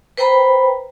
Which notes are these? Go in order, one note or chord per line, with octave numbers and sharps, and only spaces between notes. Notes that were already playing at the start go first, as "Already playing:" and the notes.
B4 C5 G5 A#5 B5